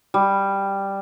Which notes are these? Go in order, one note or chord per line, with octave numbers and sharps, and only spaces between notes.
G3